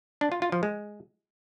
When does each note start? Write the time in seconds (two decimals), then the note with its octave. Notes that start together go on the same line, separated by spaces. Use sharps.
0.21 D4
0.32 F4
0.42 F4
0.52 F3
0.63 G#3